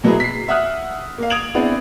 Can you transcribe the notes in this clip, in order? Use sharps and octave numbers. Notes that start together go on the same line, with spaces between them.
B2 F#3 A#3 B3 E4 G#4
B6 C7
E5 F#5 D#6 F6 F#6
A#3 F5
D#6 G#6 D7 F7 F#7
B3 C4 D4 E4 G#4 F#5